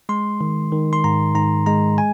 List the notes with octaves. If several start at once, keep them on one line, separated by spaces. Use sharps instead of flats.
G#3 C6
D#3
D#3
C6
G#2 A#5
G#2 A#5
G#3 A#5
G#5